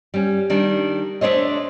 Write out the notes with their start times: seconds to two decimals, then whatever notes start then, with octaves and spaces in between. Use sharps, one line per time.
0.14 G3 C#4
0.50 D#3 G3 D4
1.21 A3 D4 C5 C#5 D#5